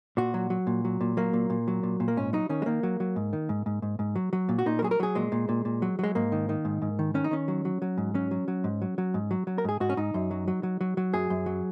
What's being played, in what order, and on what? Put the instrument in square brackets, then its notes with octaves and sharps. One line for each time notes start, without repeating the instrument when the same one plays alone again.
[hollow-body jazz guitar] A#2 F#4
F#3
F#3
A#2
F#3
A#2
F#3 A#3
A#2
A#2
F#3
A#2
A#2
A#3
G#2 C#4
F#3 D#4
D#3 C#4
G#3
D#3 A#3
F#3
F#3
G#2
D#3
G#2
G#2
G#2
G#2
F#3
F#3
A#2
F#4
A#2 D#4
A#4
F#3 G#4
A#4
F#3 G#4
A#2 G#3
A#2
A#2
A#2
F#3
F#3 G#3
G#2 A#3
D#3
D#3
G#2
G#2
D#3
D#3 C#4
D#4
D#3 C#4
F#3
F#3
F#3
G#2
F#3 C#4
F#3
F#3
G#2
F#3
F#3
G#2
F#3
F#3
A#4
G#2 G#4
G#2 F#4
C#4
G#2 D#4
F#2
F#3
F#3
F#3
F#3
F#3
F#2 G#4
F#2
F#3